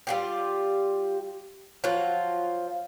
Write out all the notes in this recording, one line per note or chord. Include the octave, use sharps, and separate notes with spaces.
G3 F4 G4
F3 F#3 F4